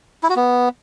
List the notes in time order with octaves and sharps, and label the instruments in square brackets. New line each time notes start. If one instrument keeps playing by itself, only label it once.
[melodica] E4
F#4
B3